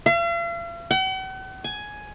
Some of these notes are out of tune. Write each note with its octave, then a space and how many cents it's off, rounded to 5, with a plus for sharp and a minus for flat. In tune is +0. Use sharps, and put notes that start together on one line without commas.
F5 -45
F#5 +45
G#5 +10